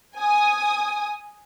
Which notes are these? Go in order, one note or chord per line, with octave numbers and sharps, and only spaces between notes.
G#5 D#6